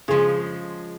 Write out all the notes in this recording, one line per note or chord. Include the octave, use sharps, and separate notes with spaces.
C#3 F3 G#3 G#4